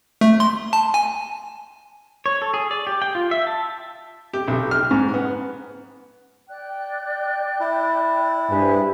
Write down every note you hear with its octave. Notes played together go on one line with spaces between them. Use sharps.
A3
C6
A5
G#5
C#5
A4
G#4
D5
G4
G5
F4
E5
A5
G4
B1
F6
G#2
B3
D5 G5 F#6
E4
G2 G#4 B4 C5 G#5